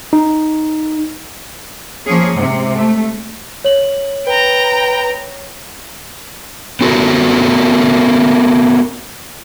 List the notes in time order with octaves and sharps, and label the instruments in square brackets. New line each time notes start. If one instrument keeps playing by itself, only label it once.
[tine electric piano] D#4
[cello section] F3 A#3 C#4 G#4
G#2 C3
A3
[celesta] C#5 F#7
[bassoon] B4 [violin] G5 A#5
[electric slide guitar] B3 C4 F#4 A4 A#4